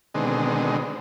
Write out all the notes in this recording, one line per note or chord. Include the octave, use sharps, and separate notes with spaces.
B2 D3 D#3 G#3 C4